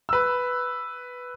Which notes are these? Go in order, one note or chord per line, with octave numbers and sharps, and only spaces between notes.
B4 E6